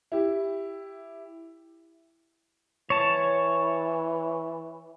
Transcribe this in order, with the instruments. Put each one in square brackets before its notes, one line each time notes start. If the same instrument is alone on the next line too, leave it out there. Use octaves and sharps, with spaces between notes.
[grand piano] E4 G4
[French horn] E3 [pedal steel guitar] C#5 A5